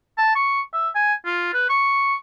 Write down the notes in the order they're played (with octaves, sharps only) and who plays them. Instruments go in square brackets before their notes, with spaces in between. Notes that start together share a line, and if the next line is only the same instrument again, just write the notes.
[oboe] A5
C#6
E5
G#5
F4
B4
C#6